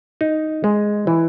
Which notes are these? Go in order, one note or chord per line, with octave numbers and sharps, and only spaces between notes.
D#4
G#3
E3